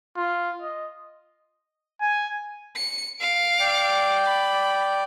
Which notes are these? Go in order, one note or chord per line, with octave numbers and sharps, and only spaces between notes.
F4
D#5
G#5
C#7
F5 D7
D5 G5
B5